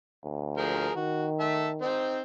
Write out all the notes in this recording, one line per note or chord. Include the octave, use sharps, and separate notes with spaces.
D2
F3 G#4 A#4
D#3 F#4
E5 A5
C4 D#4 C5